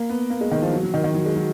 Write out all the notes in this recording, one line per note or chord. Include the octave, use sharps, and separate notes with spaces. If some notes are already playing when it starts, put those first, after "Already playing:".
Already playing: A#3
B3
A#3
G#3
D#3
F3
F#3
F#3
D#3
D#3
F#3
G#3
F#3